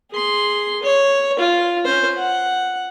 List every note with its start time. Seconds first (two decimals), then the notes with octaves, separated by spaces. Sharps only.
0.11 G#4 C6
0.83 C#5
1.39 F4
1.85 C#4 C5
2.18 F#5